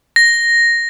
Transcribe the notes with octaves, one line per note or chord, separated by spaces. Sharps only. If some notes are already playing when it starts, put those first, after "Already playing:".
A#6